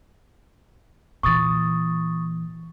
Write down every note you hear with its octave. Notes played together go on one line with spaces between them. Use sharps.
A#2 E3 C#6 D#6 A6